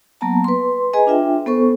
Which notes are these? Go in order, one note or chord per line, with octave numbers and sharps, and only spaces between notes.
F#3 A#3 B3 F#5 A5 A#5
B4 C6
G#4 B4 D#5 G#5 A#5
D4 F4 E5 G5
B3 A4 C5 C#6